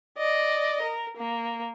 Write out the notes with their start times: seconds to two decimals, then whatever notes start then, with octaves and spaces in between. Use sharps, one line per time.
0.18 D5 D#5
0.82 A#4
1.17 A#3